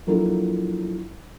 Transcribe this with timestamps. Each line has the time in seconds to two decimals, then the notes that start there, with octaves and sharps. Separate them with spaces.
0.07 F3 F#3 A#3 D4 E4 A4